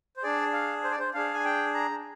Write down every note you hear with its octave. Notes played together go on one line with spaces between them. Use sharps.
C5
D4 G#4 D5
F5
C5
D5
C5
D4 G#4 F5
G#5
G5
A#5